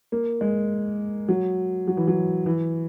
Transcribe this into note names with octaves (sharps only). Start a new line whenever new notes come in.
A#3
G#3
F#3
F#3
E3
F#3
E3